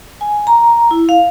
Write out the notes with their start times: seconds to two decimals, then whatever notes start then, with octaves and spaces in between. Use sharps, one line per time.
0.21 G#5
0.47 A#5
0.91 E4
1.09 F5